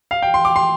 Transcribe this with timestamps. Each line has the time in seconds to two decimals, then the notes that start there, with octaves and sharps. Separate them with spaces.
0.11 F5
0.22 G5
0.34 C6
0.45 D6
0.56 C6